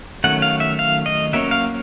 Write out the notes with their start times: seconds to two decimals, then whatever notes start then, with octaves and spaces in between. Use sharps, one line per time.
0.24 D#3 F#3 A3 C#4 F#5
0.42 F5
0.60 E5
0.79 F5
1.06 D#5
1.33 F#3 A#3 C#4 E5
1.51 F5